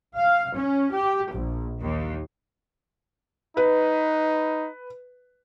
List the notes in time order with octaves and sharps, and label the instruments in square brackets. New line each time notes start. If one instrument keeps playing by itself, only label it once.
[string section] F5
C#4
G4
A#1
D#2
[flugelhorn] D#4 [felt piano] B4